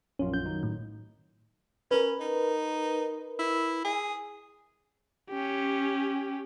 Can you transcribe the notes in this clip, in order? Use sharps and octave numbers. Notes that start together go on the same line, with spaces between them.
A#1 F#2 C#4 F4
G6
D#3 F#3 D#4
A2
C#4 A#4 B4
D#4
E4
G#4
C#4 G4